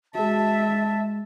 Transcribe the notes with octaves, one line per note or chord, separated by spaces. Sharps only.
G#3 F#4 G#4 E5 A5